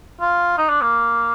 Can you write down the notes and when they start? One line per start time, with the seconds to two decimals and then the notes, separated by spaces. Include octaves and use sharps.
0.21 F4
0.58 D#4
0.69 D4
0.81 A#3